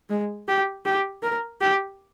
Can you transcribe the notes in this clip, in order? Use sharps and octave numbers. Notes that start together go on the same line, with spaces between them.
G#3
G4
G4
A#4
G4